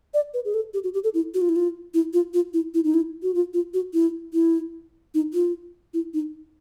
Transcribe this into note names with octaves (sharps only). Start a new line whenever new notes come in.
D5
B4
G#4
A4
G4
F#4
G4
A4
E4
F#4
F4
E4
F4
E4
F4
F4
E4
E4
D#4
E4
F#4
F4
F4
F#4
E4
E4
D#4
F4
E4
D#4